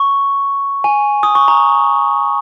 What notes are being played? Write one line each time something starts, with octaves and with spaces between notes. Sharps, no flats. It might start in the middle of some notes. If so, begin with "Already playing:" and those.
Already playing: C#6
G#5
D#6
C#6
A#5